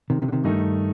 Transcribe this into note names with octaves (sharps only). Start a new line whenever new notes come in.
C3 D#3
C3 D#3
D3
C3 D#3
G2 D#3 A3 D#4